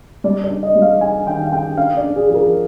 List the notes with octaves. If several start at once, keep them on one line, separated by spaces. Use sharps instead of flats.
G3 D5
D5
D4
D#5
G3
F5
D4 G#5
D#3 G5
F5
D4 G5
D4 F5
D5
D4
G#4
F3 G#4
A#4